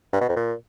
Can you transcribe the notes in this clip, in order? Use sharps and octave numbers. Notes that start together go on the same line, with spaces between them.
G2
B2
F2
A#2